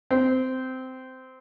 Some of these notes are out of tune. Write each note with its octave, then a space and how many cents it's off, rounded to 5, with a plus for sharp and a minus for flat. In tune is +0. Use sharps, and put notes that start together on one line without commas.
C4 -15